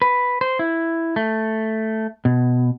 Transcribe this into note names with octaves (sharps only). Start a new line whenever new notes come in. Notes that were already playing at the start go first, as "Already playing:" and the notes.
B4
C5
E4
A3
B2